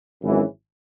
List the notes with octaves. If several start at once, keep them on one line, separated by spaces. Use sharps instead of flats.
G#1 F#2 E3 G#3 C#4